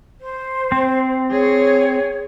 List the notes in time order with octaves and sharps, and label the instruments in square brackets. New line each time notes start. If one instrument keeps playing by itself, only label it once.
[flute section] C5
[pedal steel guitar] C4
[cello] G#4 [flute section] C#5